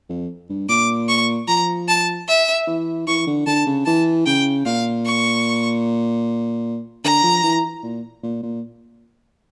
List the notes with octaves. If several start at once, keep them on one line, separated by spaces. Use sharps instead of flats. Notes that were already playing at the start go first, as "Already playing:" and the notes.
F2
G2
A#2 D6
C#6
F3 A#5
A5
E5
E3
E3 C#6
D3
D3 A5
C#3
E3 A5
C#3 G5
A#2 F5
C#6
D3 A#5
F3
E3
A#2
A#2
A#2